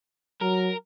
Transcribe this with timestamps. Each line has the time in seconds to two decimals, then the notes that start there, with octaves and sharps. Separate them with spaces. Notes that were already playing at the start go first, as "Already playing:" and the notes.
0.41 F#3 A#4